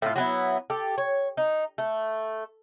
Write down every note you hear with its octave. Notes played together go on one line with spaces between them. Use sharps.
A2 F4
F#3 B3 E4
G4 A4
C#5
D#4
A3